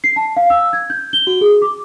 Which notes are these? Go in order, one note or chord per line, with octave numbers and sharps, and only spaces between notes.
C7
A5
F5
E6
G#6
G6
G7
F#4
G#4
D6